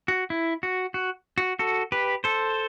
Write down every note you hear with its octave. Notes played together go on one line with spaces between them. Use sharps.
F#4
E4
F#4
F#4
F#4
F#4 A4
G4 B4
A4 C5